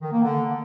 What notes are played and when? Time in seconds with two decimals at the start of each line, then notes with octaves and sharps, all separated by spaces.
0.02 D#3
0.12 A#3
0.23 D3